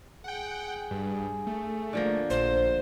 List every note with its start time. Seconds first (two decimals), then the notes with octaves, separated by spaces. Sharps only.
0.24 G#4 F#5 G5
0.91 G2
1.47 A3
1.93 D3 F3 A#3
2.30 A#1 C5